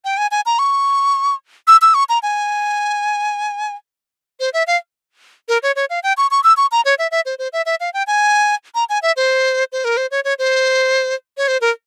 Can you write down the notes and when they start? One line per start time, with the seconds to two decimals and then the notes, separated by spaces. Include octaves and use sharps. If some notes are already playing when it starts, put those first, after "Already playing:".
0.05 G5
0.18 G#5
0.31 G#5
0.46 A#5
0.59 C#6
1.67 E6
1.82 E6
1.94 C#6
2.09 A#5
2.23 G#5
4.40 C5
4.54 E5
4.67 F5
5.49 A#4
5.63 C#5
5.76 C#5
5.90 F5
6.03 G5
6.17 C#6
6.31 C#6
6.44 E6
6.57 C#6
6.72 A#5
6.85 C#5
6.99 E5
7.11 E5
7.26 C5
7.39 C5
7.53 E5
7.66 E5
7.80 F5
7.94 G5
8.07 G#5
8.75 A#5
8.89 G#5
9.02 E5
9.17 C5
9.72 C5
9.85 A#4
9.97 C5
10.11 C#5
10.24 C#5
10.39 C5
11.37 C#5
11.48 C5
11.61 A#4